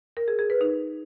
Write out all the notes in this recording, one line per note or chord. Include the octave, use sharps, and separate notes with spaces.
A#4
G#4
G#4
B4
D#4